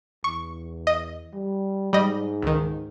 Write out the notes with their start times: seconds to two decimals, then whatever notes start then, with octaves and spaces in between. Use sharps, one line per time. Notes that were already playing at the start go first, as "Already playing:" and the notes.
0.24 E2 C#6
0.87 D#5
1.33 G3
1.93 G#2 G3 D#5
2.42 C#2 D#3